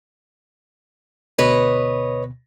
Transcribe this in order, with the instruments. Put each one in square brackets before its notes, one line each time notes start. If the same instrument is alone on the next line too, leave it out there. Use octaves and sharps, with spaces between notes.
[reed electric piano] D2 B2 [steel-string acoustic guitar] B4 C#5 D#5